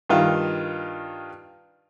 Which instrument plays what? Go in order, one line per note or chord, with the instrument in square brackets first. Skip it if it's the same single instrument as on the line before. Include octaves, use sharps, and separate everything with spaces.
[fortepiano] G2 D#3 F4